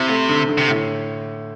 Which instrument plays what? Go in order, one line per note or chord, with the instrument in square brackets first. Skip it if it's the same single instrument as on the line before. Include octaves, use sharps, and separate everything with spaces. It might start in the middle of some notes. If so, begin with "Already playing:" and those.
Already playing: [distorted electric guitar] C3 [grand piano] C4 E4
[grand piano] A3
D3
D3
[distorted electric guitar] C3
[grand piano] A2